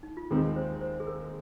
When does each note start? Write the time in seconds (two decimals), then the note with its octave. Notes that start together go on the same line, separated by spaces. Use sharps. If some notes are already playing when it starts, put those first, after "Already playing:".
0.03 D#4
0.17 F4
0.31 D#2 D#3 G#3 C4 D#4 G#4
0.56 C5
0.81 C5
1.00 G#4
1.07 A#4